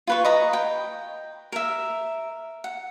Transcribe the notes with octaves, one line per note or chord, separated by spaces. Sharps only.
F4 B4 C#6
D#5 A#5 B5
G5
A#4 E5
F#5